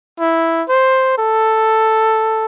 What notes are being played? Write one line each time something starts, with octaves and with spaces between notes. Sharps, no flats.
E4
C5
A4